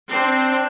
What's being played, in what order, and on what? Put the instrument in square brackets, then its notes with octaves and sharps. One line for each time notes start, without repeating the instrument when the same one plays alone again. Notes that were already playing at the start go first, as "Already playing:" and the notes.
[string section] C4 [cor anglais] D4